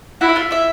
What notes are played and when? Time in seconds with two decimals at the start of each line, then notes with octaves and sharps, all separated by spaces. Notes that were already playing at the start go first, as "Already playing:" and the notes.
0.21 E4 F#4 F#5
0.29 E5
0.36 F4 F5
0.51 E4 E5